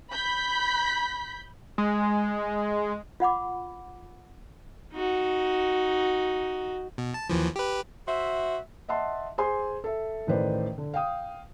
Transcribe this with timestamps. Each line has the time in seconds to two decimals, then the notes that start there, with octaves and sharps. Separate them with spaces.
0.11 B5 G6 B6
1.78 G#3
3.20 F4 F#5 B5 D6
4.93 D#4 F#4
6.98 B2
7.14 A5
7.30 D#2 E3 F3
7.56 G4 B4
8.08 F#4 C5 E5
8.88 D#5 E5 F#5 A5 C6
9.38 G#4 C5 G#5 C6
9.84 A4 E5
10.27 A1 A2 D#3 B4 C5 D5
10.78 D3
10.94 F5 G5 D#6